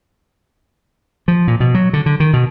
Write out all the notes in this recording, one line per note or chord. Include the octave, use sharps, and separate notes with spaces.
F3
A#2
B2
F#3
D3
D3
D#3
B2